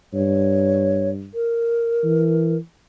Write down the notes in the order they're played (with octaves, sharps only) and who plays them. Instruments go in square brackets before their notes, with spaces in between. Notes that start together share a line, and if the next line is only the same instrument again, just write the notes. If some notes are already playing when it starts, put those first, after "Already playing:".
[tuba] G2 [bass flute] C#5
[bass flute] A#4
[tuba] E3